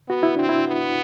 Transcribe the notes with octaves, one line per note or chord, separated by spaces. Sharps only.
B3 F#4
E4
C4 D4
E4
B3